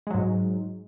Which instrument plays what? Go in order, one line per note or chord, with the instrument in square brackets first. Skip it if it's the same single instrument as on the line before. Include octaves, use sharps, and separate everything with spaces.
[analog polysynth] G#3
F#3
G#2